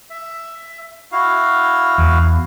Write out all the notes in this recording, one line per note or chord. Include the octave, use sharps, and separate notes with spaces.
E5
E4 F#4 F5
E2